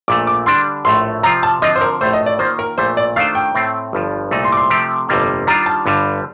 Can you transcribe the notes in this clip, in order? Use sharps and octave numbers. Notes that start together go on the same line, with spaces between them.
A#1 A#2 A3 D6
D6
D3 G3 D4 C6
A#1 A2 A3 C6
C3 F3 C4 F4 A#5
A5
D3 F3 C4 F4 D#5
C5
A#4
A#1 A2 A3 C5
D#5
D5
D#3 A#3 F4 C5
A#4
A#1 A#2 A3 C5
D5
D#3 A3 D4 F4 C5 F5
G5
A2 A3 C4
G1 G2 F3
C2 A#2 A3 D#4
C6
D6
C6
C3 F3 A3 C4 G4
G1 F2 C3 G3 A#3
D#3 G3 D4 F4 A#5
A5
G1 G2 D3 G3